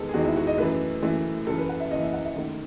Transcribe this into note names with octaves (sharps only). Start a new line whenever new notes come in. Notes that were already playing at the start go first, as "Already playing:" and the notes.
Already playing: E2 D#3 G#3 A4 B4
G#4
E2 D#3 G#3 F#4
E4
F#4
D#5
F#2 E3 A3 B4
F#2 E3 A3
F#2 C#3 E3 A4
B4
F#5
E5
F#2 C#3 E3 D#5
E5
F#5
E5
F#2 D#3 A3